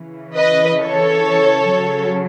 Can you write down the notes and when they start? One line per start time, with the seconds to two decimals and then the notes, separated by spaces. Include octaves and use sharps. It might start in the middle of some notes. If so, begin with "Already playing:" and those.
Already playing: C#3 E3
0.36 B4 D#5
0.81 A4 C#5
1.71 C#3 F#3